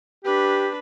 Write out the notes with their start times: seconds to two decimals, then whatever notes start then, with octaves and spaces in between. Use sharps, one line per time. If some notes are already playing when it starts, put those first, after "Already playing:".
0.25 D4 G4 B4